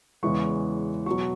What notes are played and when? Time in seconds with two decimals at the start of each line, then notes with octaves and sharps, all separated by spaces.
0.23 E2 C#3 E3 G#3 C#6
1.06 B2 F#3 C#6